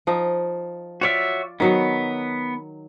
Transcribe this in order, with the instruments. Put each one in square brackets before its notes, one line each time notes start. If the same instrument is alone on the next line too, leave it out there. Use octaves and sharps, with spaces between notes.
[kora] F3 D#4
[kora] F4 D5 [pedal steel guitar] F#4 C#5 E5
[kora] D#3 F#3 D#4 [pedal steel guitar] B3